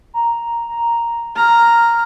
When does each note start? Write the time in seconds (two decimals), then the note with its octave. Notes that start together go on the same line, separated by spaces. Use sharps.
0.14 A#5
0.69 A#5
1.36 A#5 F6